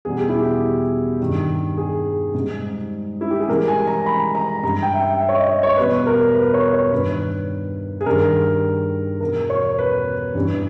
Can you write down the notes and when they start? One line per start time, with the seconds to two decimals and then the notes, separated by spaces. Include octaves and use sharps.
0.05 E2 B2 G3 G#4
0.17 G4
0.28 E4
0.39 G4
1.20 G2 D#3 G3
1.77 G#4
2.35 G#2 G3
3.21 E4
3.31 G4
3.40 G#4
3.48 G#2 E3 G3 A#4
3.68 G#5
3.87 A#5
4.06 B5
4.35 A#5
4.63 G2 G3 A#5
4.82 G5
4.94 E5
5.01 G5
5.20 E5
5.29 C#5
5.35 D#5
5.49 D#5
5.63 C#5
5.77 E2 B2 G3 B4
6.07 A#4
6.35 B4
6.54 C#5
6.73 C#5
6.92 G2 D#3 G3 B4
8.01 G#4
8.06 G2 D#3 G3 A#4
9.21 E2 B2 G3 A#4
9.50 C#5
9.79 B4
10.35 G2 E3 G3